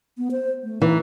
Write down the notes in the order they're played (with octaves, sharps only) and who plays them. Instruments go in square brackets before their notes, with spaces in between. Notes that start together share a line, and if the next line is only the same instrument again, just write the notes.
[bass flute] B3
C5
A3
[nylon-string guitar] E3 [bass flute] D#4